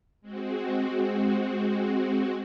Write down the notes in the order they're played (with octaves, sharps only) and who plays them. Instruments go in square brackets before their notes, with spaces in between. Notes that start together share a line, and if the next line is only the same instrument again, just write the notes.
[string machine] G#3 C4 F#4